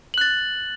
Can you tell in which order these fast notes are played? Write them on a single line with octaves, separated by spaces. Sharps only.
F#7 F#6 A6